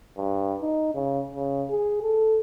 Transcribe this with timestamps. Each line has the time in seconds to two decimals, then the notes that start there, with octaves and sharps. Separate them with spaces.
0.17 G2
0.62 D#4
0.94 C#3
1.34 C#3
1.70 G#4
2.03 A4